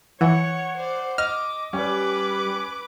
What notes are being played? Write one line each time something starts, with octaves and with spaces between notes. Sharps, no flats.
E3 C#5 F#5
C5 D5
D#5 D6 F6
G3 C#4 B4 D6